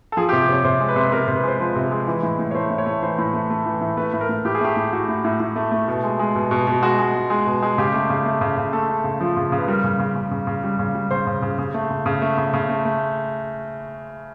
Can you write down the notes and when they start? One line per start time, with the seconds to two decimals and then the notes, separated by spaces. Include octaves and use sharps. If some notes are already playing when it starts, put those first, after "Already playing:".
0.12 A4
0.17 F3 G#4
0.29 G4
0.33 C3
0.49 C3 C#5
0.64 C3 C5
0.80 G#3
0.89 B4
0.96 C3
1.12 C3 A#4
1.28 C3
1.36 B4
1.44 G#3 C5
1.60 F3 B4
1.76 C3
1.91 G#3
2.07 E3
2.23 A2
2.39 A2
2.51 C#5
2.54 A3 C5
2.70 A2
2.78 C#5
2.86 A3
3.02 E3 C5
3.18 A2
3.33 A3
3.50 A3
3.66 E3
3.81 A2
3.97 A3 B4
4.13 A2
4.21 A#4
4.29 A2
4.45 A2 G4
4.55 G#4
4.61 A3 G4
4.77 A2
4.93 A2 F#4
5.09 A2
5.25 A2
5.40 A2
5.56 A3
5.72 A3
5.88 B2
6.04 G#3
6.19 G#3
6.35 B2
6.51 B2
6.67 B2
6.82 G#3 F#4
6.99 G#3
7.14 G#3
7.30 G#3
7.46 B2
7.62 G#3
7.78 C#3 G4
7.94 A3
8.10 C#3
8.25 A3
8.41 C#3
8.57 C#3
8.73 A3 A4
8.89 A3
9.04 C#3
9.21 F3
9.37 C#3
9.52 C#3
9.58 B4
9.68 G3 A#4
9.84 C#3
9.99 C#3
10.15 C#3
10.31 C#3
10.47 C#3
10.63 G3
10.79 C#3
10.95 G3
11.11 C#3 C5
11.27 C#3
11.42 C#3
11.58 C#3
11.74 A3
11.90 C#3
12.06 C#3
12.22 A3
12.37 C#3
12.54 C#3
12.69 A3
12.85 A3